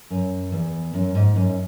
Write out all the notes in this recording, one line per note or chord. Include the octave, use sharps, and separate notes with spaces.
F#2
E2
F#2
G#2
F#2